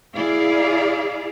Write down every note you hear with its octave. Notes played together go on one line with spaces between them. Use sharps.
E4 G#4 D5 F5